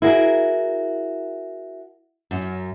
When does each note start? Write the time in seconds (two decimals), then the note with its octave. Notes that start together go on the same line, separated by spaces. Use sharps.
0.02 E4 F#4 G#4 A#4
2.31 F#2